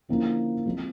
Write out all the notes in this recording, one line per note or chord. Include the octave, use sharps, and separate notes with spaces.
D3 F3 A#3 C#4 E4
F3 G#3 C4